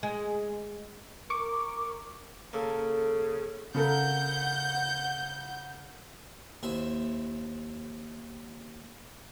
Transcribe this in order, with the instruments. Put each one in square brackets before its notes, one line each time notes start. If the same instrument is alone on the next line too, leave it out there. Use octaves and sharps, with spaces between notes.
[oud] G#3
[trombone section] A#4 [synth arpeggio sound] C#6 D6
[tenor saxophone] C#3 [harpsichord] A#3 [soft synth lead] A4
[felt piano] C#3 A4 A#4 [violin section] F#5 G6
[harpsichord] D#2 E4 C5